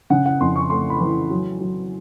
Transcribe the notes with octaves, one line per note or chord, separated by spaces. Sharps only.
C#3 F#5
F#5
F2 C6
C#6
A3 C6
B5
E3
F#3
F#3